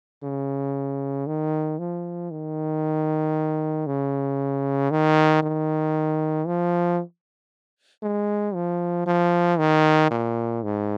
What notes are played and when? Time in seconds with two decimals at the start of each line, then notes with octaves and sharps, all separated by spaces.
0.23 C#3
1.27 D#3
1.79 F3
2.31 D#3
3.87 C#3
4.91 D#3
5.43 D#3
6.47 F3
8.03 G#3
8.54 F3
9.06 F3
9.59 D#3
10.10 A#2
10.63 G#2